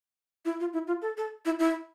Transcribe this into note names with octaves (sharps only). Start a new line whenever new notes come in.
E4
F4
E4
F4
A4
A4
E4
E4